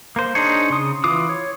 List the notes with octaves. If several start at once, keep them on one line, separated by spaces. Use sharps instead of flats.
A#3 C5
D4 D#4 G#4 C5 C#5
C#3 C6 D#6
E3 F4 D6 D#6
C#5